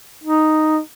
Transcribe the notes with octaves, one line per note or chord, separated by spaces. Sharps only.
D#4